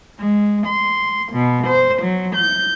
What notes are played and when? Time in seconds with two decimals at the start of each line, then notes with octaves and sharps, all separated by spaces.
0.18 G#3
0.66 C6
1.31 B2
1.66 C5
2.01 F#3
2.35 G6